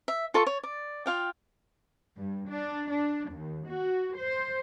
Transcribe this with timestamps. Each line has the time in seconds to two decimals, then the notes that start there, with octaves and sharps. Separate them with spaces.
0.08 E5
0.34 F4 A4 A5 C#6
0.47 C#5
0.63 D5
1.06 F4 F5 G5
2.17 G2
2.49 D4
2.90 D4
3.32 D#2
3.67 F#4
4.16 C5